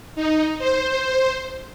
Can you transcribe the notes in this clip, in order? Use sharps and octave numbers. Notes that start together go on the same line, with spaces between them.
D#4
C5